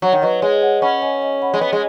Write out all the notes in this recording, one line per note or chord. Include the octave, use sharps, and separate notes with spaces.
F#3 C#5 F#5
D#3
F#3 B4 D#5
G#3 G#4 C#5
C#5 F#5
C#4 F#5 B5
D#5 G#5
D#5 G#5
F#5 B5
G#3
B3
G#3